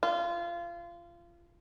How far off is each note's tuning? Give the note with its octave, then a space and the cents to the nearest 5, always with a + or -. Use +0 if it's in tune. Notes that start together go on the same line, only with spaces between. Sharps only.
F4 -25